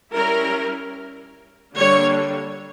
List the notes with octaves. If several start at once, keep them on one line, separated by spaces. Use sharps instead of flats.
G3 C#4 E4 A#4
D3 G3 A#3 D4 C#5